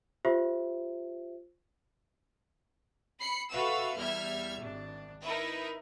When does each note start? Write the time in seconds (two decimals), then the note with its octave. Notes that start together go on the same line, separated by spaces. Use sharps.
0.25 F4 G4 C5 E5
3.19 B5 C7 C#7
3.51 F#4 A4 B4 E5 F5 E6
3.98 E2 G3 E5 F6 G#6
4.61 G#1 D4
5.21 D#4 E4 A#4 B4 E5